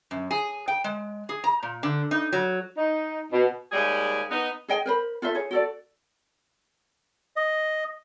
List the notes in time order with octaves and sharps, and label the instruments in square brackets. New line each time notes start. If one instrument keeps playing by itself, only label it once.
[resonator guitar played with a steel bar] F#2
G#4
G5
G#3
G#4
A#5
A#2
D3
D#4
F#3
[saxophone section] D#4
B2
D#2 G3 G#3 G#4
B3 D#4
[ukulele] G#4 D#5 G5 G#5
A#4 C5 B5
F4 A4 C5 E5
G#4 C#5
F#4 A4 D5
[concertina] D#5